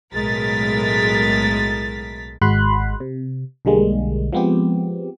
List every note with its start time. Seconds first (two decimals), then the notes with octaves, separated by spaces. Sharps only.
0.12 B1 A2 G#3 A#4 A6 B6
2.41 G#1 G#3 F#4 B5 C6 F#6
3.00 C3
3.65 B1 D3 G3 G#3 A#3
4.33 F3 G#3 B3 C4 G4